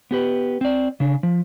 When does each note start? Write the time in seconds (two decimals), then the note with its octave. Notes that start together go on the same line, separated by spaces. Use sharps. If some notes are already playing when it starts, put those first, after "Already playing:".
0.11 B3 G4 B4
0.61 C4 D5
1.00 C#3 D4
1.23 F3